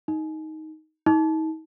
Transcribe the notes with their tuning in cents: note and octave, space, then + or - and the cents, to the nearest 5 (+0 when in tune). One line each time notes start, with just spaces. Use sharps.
D#4 +10
D#4 +40